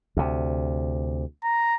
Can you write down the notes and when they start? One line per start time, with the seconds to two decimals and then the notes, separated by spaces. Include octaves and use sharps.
0.17 D2 C3
1.44 A#5